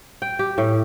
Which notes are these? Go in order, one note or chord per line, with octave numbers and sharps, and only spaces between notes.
G5
G4
A2